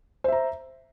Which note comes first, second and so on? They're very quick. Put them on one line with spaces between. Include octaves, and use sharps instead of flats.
C5 E5 A#5